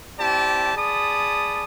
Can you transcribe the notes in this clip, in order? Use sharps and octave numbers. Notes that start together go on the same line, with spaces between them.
C4 E4 G4 D5 A5
G#4 D5 A5 B5 D#6